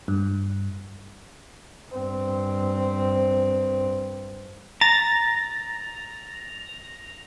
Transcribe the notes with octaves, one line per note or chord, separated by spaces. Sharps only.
G2
G2 C4
A#5 A6